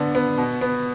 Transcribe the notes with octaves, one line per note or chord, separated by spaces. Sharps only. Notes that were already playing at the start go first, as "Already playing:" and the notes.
Already playing: D3 B3 D4
B3
B2
B3